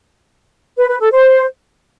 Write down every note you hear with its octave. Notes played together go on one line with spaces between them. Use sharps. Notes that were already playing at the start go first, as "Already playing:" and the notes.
B4
B4
A4
C5